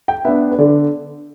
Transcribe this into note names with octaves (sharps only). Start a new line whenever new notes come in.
G5
B3 D4 E5
B4
D3 D5